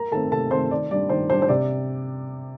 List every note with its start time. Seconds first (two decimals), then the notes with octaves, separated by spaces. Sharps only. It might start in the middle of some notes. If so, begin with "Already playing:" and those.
Already playing: A#4 A#5
0.12 D#3 A3 C4 A4 A5
0.32 C3 A4 A5
0.51 D#3 A3 C4 C5 C6
0.71 D#3 D5
0.91 G3 D4 D5
1.09 D#3 C5
1.30 G3 D4 C5
1.42 C5
1.49 C3 D5